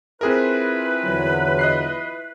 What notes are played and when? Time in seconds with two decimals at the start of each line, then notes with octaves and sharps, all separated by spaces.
0.21 C4 E4 F4 G#4 A#4 B4
1.05 E2 D3 F#3
1.59 D#5 F#6 C7